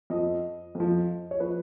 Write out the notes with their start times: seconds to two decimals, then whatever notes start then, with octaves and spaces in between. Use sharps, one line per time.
0.10 F2 F3 D#5
0.75 F2 F3
1.31 C#5
1.40 F3 B4